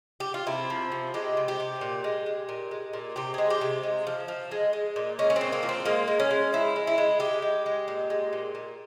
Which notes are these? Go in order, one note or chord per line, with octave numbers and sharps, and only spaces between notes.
G4
F4
C3 E4
F3
C3
G#3 G4
C3
G4
C3
A#2
G#3
G#3
A#2
G#3
A#2
C3 G4
G#3 G#4
G4
C3
G#3
F3
F3
G#3
G#3
A#2
G#3 C#4
C#4
C4
A#2
A#3
F3
C4
G#3 A#3
G#3
C#4
G#3
F3 E4
G#3
E4
G#3
G#3 G4
G#3
G#3
A#2
G#3
A#2
A#2